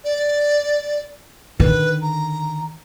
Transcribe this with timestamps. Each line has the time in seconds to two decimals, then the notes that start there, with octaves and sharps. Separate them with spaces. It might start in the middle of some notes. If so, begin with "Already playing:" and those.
0.04 D5
1.60 D3 D#3 B4
2.02 A#5